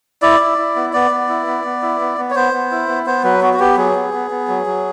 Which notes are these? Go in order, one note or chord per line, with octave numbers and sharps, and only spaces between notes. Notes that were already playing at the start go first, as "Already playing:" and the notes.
E4 D5
E4
E4
B3
B3 D5
B3
E4
B3
B3
E4
B3
B3
C#5
B3 C5
B3
E4
B3
B3 C5
F#3 B4
B3 F#4
F#4
B3 G4
F#3 G#4
B3
B3
B3
F#3
F#3